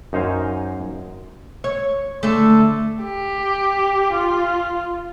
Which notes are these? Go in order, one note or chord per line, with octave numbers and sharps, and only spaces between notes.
F#2 D#4 C5 F5 G#5
C#5
D3 A3
G4
F4